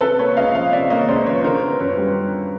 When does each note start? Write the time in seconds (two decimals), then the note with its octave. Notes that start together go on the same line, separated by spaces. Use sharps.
0.01 C3 A4 B4
0.19 A#3 B4 C#5
0.37 C#2 D#5 F5
0.54 F3 D#5 F5
0.72 C3 D5 E5
0.90 A#3 C#5 D#5
1.08 C#2 C5 D5
1.26 F3 B4 C#5
1.44 D3 A#4 C5
1.62 B3
1.80 F#2 B4 C#5
1.98 G3